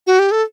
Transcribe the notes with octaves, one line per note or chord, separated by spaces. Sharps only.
F#4
G4
A4